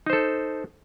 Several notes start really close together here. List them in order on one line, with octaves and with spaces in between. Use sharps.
D#4 C5 A4